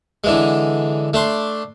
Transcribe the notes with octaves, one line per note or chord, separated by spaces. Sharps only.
D3 E3 G#3
A3 D4 C6